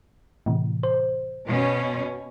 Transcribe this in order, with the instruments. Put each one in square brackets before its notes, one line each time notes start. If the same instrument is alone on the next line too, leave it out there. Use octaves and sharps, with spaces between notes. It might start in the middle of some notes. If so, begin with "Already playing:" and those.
[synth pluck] A2 C3 E3
C5
[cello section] B2 C#4